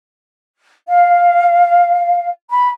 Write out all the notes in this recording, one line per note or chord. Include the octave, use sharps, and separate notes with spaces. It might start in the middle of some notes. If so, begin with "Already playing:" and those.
F5
B5